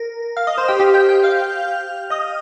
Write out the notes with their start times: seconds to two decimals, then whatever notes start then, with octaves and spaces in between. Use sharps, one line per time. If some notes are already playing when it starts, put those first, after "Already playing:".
Already playing: A#4
0.37 F5 F6
0.47 D#5 D#6
0.57 C5 C6
0.68 G4 G5
0.80 G4 G5
0.94 G5 G6
1.09 G5 G6
1.24 F5 F6
2.10 D#5 D#6